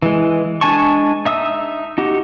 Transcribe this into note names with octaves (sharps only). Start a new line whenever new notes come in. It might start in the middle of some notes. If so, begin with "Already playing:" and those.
E3 G#3
G#3 D4 G#5 A5 C#6
D#4 E5 D#6 E6
D#4 F#4 G4